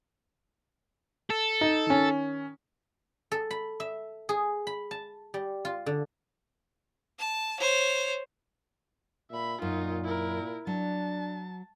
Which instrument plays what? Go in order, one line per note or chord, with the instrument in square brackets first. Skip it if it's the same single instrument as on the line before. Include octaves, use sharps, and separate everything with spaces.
[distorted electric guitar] A4
[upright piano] D#4
D#3 C#4
[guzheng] A4
B5
E5
G#4
B5
A5
G3
F4
D3
[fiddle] A5
C5 C#5
[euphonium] A#2 [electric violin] E5 B5
[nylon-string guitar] F#2 [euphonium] A#2 [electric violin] D#4 F4
[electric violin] E4 A#4
[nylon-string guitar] F#3 [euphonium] D4 [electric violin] A5